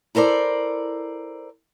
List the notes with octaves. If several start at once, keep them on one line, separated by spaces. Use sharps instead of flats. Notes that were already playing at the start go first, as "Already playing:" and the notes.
E4 A4 A#4 C5 D5